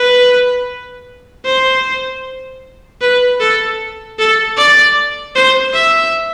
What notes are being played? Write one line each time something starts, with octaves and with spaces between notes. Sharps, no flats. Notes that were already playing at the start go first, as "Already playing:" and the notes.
Already playing: B4
C5
B4
A4
A4
D5
C5
E5